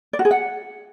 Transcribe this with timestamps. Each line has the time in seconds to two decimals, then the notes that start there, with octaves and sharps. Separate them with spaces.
0.13 D5
0.19 F#4
0.25 G#4
0.31 F#5